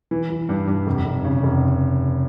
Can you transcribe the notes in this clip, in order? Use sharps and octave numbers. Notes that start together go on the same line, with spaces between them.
E3
E3
G2
G2
F1
F1
C#3
F1